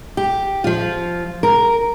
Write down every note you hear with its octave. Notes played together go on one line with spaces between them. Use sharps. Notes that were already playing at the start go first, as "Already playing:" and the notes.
G4
F3 F4
A#4